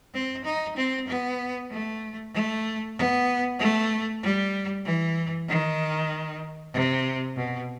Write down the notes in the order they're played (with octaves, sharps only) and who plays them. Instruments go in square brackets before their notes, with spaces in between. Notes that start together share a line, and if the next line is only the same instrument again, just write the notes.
[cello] C4
D#4
C4
B3
A3
A3
B3
A3
G3
E3
D#3
C3
B2